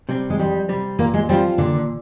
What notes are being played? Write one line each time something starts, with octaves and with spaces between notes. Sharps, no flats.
C3 G3 C4
G#3
F2 G3
C3 G3 C4
A#2 A#3
G#3
F3 G3 C4 F4
A#2 D3